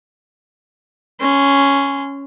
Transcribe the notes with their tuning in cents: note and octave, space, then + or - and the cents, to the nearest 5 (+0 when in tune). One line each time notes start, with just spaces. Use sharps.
C#4 +0 C6 -25